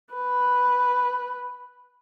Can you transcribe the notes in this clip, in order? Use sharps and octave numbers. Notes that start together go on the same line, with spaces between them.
B4